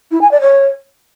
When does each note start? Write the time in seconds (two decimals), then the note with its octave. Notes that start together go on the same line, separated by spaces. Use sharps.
0.11 E4
0.21 G#5
0.31 D5
0.41 C#5